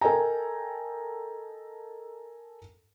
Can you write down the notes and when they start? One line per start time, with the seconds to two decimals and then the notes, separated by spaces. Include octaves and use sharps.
0.01 A4 A#4 D#5 G5 G#5 A#5